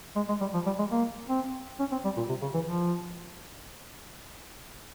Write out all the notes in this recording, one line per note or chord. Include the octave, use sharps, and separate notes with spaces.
G#3
G#3
G3
F3
G3
G#3
A#3
C4
C#4
C4
G3
A#2
C3
C#3
E3
F3